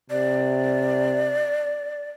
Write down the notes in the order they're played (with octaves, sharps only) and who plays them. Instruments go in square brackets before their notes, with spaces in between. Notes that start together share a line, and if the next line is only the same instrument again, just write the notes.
[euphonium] C3 [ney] D5